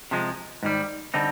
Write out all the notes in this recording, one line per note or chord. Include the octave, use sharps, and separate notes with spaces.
C3 F3 G#3
G#2 D#3 G3
D3 G3 C4 D#4